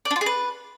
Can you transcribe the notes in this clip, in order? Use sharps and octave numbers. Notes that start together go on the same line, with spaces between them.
D5
D4
F4
G#4
B4